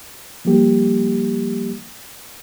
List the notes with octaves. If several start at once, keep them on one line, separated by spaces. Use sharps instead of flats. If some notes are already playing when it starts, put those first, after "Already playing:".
F3 G3 A#3 G4